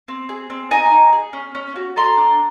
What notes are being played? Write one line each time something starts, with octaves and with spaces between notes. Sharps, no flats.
C4
G#4
C4
D#4 G#5 A#5
D#4
G#4
C#4
C#4
F#4
A4 A#5 C6
D4